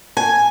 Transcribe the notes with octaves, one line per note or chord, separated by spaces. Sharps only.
G#5